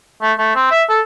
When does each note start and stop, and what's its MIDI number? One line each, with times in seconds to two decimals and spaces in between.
0.22 0.33 57
0.39 0.52 57
0.56 0.71 60
0.71 0.83 76
0.90 1.01 69